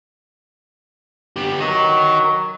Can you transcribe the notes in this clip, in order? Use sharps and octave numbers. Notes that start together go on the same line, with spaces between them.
B3 G4
F#3 A#4 D#5